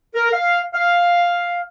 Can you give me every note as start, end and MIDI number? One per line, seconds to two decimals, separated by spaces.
0.15 0.29 70
0.32 0.60 77
0.74 1.61 77